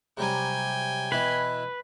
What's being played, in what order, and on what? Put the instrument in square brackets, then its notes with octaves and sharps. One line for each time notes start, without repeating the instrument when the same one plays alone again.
[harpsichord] C3 F#3 G3 [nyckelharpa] G5 G#5
[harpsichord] B2 E3 E4 [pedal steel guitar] B4